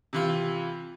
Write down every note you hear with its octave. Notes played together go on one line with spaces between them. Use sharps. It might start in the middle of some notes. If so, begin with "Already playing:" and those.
C3 E3 F4